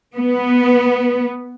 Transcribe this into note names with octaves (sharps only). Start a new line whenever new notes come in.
B3